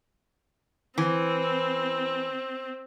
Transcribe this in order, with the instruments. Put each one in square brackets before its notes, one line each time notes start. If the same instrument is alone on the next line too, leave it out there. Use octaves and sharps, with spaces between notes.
[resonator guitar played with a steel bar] E3 [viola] C4